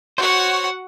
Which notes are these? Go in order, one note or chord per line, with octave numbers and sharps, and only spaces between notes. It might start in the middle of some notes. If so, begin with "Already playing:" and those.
F#4 C5 C#5 F#5